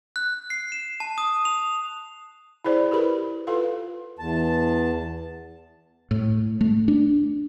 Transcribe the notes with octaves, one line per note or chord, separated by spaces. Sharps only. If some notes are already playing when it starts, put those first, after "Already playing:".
F#6
C7
E7
A5
D#6
F7
E4 G#4 C5 D5
G4 A#4 B4 B5
F4 A4 B4 F5
E2 A5
A2
A3
D4